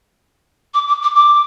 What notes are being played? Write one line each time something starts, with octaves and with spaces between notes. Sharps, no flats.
D6
D6
D6
D6